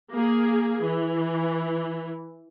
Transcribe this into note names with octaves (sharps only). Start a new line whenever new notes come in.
A#3 G#4
E3